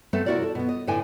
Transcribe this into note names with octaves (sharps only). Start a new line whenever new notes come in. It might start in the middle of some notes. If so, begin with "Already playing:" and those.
A3 B3 C4 A4 B4
C3 E4 F#4 A#4 D5
A4
B2 B3
D#5
A2 D3 E4 B4 G5 G#5